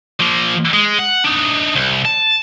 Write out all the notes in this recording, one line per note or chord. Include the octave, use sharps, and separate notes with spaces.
F3 A#3
G#3
F#5
D4 D#4
C2
A5